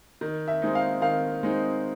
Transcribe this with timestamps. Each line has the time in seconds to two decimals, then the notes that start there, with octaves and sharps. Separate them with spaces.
0.21 D#3
0.48 E5
0.62 G#3 C4 D#4
0.75 F5
1.02 D#3 F5
1.43 G#3 C4 D#4